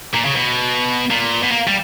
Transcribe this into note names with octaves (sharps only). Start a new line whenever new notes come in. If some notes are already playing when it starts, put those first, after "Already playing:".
A#2
C#3
B2
A#2
B2
A#3
G3